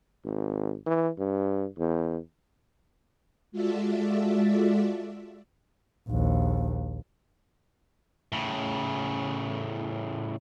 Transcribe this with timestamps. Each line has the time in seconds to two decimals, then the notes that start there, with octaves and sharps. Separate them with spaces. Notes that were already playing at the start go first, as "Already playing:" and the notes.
0.25 G#1
0.86 E3
1.19 G2
1.79 E2
3.52 G#3 F4 F#4 A4 D5 E5
6.09 A#1 D#2
8.32 A2 C#3